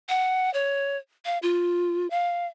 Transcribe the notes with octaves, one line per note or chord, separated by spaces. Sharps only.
F#5
C#5
F5
F4
F5